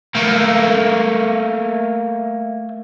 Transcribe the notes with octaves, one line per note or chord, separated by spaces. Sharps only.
A3 A#3